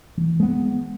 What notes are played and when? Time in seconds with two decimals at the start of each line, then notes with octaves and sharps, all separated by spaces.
0.17 E3
0.40 G#3 B3